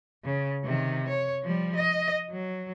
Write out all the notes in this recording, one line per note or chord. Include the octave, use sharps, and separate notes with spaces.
C#3
C3 D#3
C#5
F3 G3
D#5
F#3